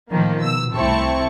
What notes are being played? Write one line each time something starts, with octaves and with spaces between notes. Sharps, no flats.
A2 D#3 F3 A#3
B2 E6
C2 A3 C4 E4 A5 C#6